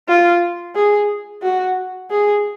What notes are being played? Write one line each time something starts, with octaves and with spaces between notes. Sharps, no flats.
F4
G#4
F#4
G#4